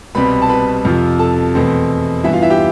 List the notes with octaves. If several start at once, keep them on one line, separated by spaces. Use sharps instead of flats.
C2 B2 G3 C4 B4 B5
A5
B4 B5
F2 C3 F3
A4 A5
E2 B2 A3 C4
G2 E3 B3 E4 E5
F4 F5
E4 E5
G4 G5